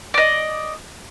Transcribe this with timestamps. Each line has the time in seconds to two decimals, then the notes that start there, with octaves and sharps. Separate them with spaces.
0.14 D5 D#5